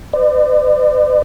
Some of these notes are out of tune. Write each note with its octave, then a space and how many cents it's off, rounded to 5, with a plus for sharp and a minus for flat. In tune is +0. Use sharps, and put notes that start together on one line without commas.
B4 +45 D5 +40